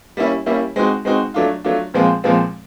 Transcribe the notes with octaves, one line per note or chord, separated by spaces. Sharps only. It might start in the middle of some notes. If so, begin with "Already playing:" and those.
G3 A#3 C#4 E4
G3 A#3 C#4 E4
G#3 C4 D#4 F#4
G#3 C4 D#4 F#4
F#3 A3 D4 F4
F#3 A3 D4 F4
A#2 F3 G#3 C4 F4
A#2 F3 G#3 C4 F4